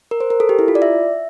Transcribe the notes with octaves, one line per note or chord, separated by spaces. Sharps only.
A#4
C5
A#4
A4
G4
E4
F4
D5
E5